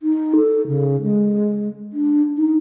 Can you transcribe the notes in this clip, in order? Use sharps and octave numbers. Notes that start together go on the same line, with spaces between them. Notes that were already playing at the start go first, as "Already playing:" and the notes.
D#4
A4
C#3
G#3
D4
D#4